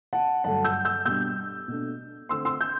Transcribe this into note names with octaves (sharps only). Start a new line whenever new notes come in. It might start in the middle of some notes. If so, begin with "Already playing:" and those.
F#5 A5
G2 D3 F#3 A3 F#5 A5
E6 G6
E6 G6
B2 G3 D4 E6 G6
B2 A3 D4
D3 A3 C4 C6 E6
C6 E6
E6 G6